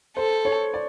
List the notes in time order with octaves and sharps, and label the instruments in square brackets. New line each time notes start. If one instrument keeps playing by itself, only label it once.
[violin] A4 [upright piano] C5
[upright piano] C#5
D5